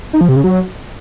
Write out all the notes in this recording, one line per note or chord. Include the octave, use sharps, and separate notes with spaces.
D#4
F3
C3
C#3
F#3